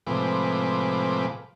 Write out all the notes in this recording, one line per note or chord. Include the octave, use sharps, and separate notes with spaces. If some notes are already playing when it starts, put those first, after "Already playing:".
A2 C3 F3 G#3 B4 D6